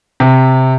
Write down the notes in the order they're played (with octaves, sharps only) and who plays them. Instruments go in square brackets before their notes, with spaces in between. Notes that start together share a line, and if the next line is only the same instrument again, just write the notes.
[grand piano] C3